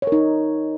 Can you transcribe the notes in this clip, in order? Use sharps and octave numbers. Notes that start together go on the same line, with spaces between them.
D#4 A#4 C#5